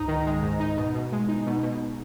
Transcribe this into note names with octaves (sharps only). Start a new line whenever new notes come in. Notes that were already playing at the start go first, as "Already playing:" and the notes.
Already playing: C#2 G#2 D#4 A#5
D#3
G#3
G#2
D#4
B2
B2
G#3
D#4
B2
B2